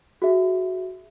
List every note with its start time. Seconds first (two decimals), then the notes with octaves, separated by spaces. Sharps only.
0.22 F#4 G#4 E5